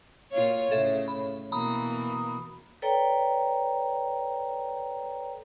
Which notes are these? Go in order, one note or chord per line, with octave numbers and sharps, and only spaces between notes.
A#2 F4 C#5
A2 C#3 A4 E5
B5
B2 E3 A#3 A#5 B5 D#6
A4 B4 C#5 D5 G5 A#5